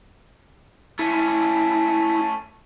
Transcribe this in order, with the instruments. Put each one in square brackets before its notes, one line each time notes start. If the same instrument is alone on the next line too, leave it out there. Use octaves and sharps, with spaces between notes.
[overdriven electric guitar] A3 C#4 [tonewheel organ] E4